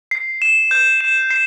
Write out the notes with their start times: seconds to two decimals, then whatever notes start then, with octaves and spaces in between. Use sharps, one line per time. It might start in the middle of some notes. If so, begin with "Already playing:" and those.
0.11 C7
0.42 E7
0.71 G6
1.01 E7
1.30 C7